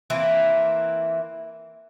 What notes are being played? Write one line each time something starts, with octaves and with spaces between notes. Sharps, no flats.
E3 A#3 C4 E4